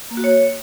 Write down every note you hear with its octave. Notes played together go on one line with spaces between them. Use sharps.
A#3
F#4
C#5